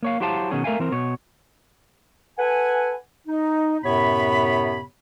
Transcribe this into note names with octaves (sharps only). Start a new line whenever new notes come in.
A#3 C#5 F5
F#3 E4 G4 C5 F5 A5
B2 D#3 F#3 C#4 G#4
A3 A#4 E5 F5 G#5
E3 C4 A#4
B2 C#5
A4 B4 F#5 G#5
D#4
F#2 A2 C3 B3 C#5 B5